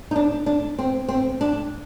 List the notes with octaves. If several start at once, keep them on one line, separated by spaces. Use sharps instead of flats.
D#4
D4
D4
C4
C4
D4